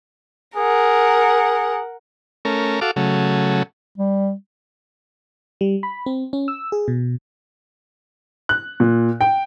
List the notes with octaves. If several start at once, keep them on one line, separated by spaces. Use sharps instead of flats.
G#4 A#4 F#5
A3 C#4 A#4
F#4 A4 F5 D6
C#3 F#3 A3
G3
G3
B5
C4
C#4
E6
G#4
B2
F#6
A#2
G5